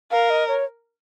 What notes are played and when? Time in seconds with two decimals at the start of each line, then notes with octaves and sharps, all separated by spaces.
0.11 A#4 F5
0.30 D#5
0.48 C#5